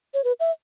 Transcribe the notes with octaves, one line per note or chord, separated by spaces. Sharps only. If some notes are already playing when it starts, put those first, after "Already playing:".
C#5
B4
E5